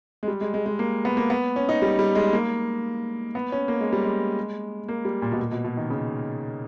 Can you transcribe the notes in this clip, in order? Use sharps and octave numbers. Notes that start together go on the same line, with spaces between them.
G#3
G3
G#3
G#3
G#3
A#3
B3
A#3
B3
C#4
D#4
G3
G3
G#3
A#3
B3
C#4
A#3
G#3
G3
G#3
A#3
G3
A#2
B2
A#2
B2
B2
D#3
C#3